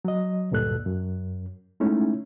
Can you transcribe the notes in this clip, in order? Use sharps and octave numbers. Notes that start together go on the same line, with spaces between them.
F#3 D#5
D2 G2 A#2 A4 F#6
F#2
G#3 A3 C#4 D#4 E4